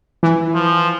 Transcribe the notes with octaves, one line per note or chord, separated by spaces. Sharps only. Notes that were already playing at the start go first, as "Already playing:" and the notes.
E3
F3